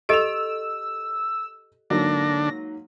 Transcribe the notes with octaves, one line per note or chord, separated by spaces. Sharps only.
G4 A4 D#5 E6 D7 E7 F7
G#2 D3 F#3 A#3 D4 A#6